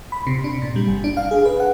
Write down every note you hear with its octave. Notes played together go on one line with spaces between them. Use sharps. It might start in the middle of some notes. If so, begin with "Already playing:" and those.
B5
C3
D4
A#2
G3
G1
D4
F5
G#4
B4
F#5